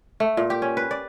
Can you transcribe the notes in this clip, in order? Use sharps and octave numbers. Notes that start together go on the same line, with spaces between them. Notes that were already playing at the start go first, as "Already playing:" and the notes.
A3
A#2
G4
C#4
B4
D5